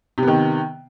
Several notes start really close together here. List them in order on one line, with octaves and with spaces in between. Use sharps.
C3 B3 D#3